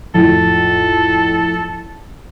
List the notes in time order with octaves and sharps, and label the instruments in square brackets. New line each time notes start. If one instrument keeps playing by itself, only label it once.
[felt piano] F2 A2 [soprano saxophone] A4